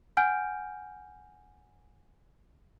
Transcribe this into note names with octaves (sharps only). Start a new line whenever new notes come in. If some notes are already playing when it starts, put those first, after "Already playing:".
F#5 G#5 F6 G6 D7